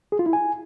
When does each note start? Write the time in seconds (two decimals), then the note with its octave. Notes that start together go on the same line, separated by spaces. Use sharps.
0.12 G#4
0.19 F4
0.26 E4
0.33 G#5